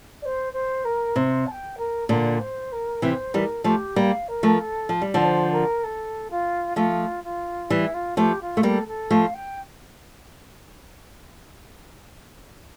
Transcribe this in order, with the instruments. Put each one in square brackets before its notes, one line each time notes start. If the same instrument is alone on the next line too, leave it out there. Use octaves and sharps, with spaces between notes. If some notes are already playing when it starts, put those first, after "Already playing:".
[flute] D5
C5
C5
A#4
[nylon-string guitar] C3 [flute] C5
[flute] A5
G5
A#4
[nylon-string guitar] A#2 D3 [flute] A#4
[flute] C5
A#4
[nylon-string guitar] C3 E3 [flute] C5
[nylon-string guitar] E3 G3 [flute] A#4
[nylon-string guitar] F3 A3 [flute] G4
[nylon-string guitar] G3 A#3 [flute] F5
[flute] A#4
[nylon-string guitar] F3 A3
[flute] A4
[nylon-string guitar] F3
G3
D3 F3
[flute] D5
C5
A#4
A4
F4
[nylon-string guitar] F3 A3 [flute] F4
[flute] F4
[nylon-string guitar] E3 G3 [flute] E4
[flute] F4
[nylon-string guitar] F3 A3 [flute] G4
[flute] F4
[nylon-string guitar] A3
[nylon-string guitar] G3 A#3 [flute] A4
[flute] A4
[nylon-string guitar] F3 A3 [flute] F5
[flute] G5